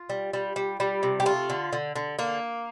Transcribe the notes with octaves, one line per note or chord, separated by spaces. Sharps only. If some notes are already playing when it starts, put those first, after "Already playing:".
Already playing: F4
G3
G3
G3
G3
C3
G4
A3 F4
D3
D3
D3
D3 A#3